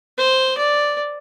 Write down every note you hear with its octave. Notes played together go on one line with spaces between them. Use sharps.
C5
D5